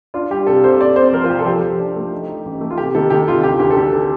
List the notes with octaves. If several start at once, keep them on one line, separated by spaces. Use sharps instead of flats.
D4 F4
G3 G4
C3 A4
C2 C5
C4 D5
C4 C5
F3 A#4
F4
C3 G4
A4
F3 G4
F3
D4
A3
D#4
D#4
A1
A3
F4
C3 G4
D#3 A4
D#3 G4
C3 F4
D2 G4
D2 G4
A4
D3 G4
A4